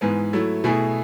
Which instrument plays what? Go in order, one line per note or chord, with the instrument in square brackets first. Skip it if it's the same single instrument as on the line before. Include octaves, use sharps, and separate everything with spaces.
[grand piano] G#2 E3 G#3 B3
F#3 A3 E4
B2 A3 E4 G#4